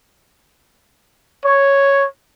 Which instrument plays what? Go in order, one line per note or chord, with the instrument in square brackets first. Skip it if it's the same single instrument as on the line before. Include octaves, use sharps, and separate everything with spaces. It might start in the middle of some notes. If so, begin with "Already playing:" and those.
[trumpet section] C#5